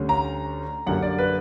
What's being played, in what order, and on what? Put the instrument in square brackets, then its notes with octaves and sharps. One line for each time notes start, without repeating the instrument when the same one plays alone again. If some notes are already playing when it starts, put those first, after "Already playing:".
Already playing: [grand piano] D2 D3 G3 C#4
A#5
F#2 D3 G3 A#3 F#5
D5
B4